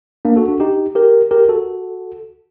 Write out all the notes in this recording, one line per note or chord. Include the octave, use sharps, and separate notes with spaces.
A#3 D4
F#4 A4
D4 F#4
D#4 G4
G4 A#4
G4 A#4
F#4 A4